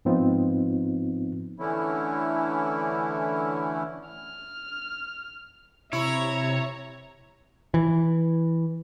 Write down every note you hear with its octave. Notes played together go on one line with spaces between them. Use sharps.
G#2 F3 B3 C4 D#4 F4
D3 E3 A3 C#4 E4
F6
C3 E4 C#5 E5 A#5
E3